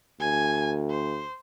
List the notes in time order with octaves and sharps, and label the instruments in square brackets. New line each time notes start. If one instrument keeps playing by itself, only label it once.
[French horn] D2 [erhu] G#5
[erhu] C5